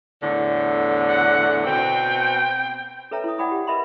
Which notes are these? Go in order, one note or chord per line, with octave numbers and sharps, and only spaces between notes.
E2 A2 D3
F#5
B2 C4 G5
A4 B4 C#5 E5 G5 A#5
E4 D#6
D5 F#5 G5 B5 D6 D#6
G4
A#4 B4 D#5 E5 B5 C6